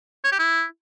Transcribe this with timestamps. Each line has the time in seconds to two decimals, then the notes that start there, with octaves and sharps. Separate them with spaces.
0.24 C#5
0.32 G4
0.39 E4